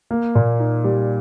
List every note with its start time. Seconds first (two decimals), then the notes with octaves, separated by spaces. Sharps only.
0.11 A#3
0.35 A#2
0.60 D#4
0.84 G3